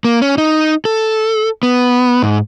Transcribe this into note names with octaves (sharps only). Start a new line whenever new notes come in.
A#3
C#4
D#4
A4
B3
G#2